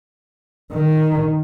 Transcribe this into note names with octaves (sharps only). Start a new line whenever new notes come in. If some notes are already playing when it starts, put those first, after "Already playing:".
D#3